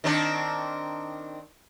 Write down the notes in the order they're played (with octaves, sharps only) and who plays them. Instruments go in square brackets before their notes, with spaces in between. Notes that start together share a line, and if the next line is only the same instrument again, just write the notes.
[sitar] D#3 C4 D4